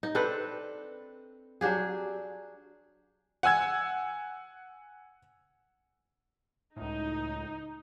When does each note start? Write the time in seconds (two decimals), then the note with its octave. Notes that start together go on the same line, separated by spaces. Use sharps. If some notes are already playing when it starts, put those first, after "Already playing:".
0.03 D#4
0.15 C4 D4 A4 B4
1.61 F#3 D4 G4 G#4
3.43 F#5 G#5 E6 G#6
6.76 C#2 A2 D#4